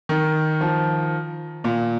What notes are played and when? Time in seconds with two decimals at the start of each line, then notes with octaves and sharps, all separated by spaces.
0.09 D#3
0.61 F3
1.64 A#2